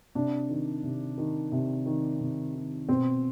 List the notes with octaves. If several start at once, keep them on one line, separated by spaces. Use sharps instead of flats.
C3 D4
D#3
C3
D#3
C3
D#3
C3
D#3
B2 C4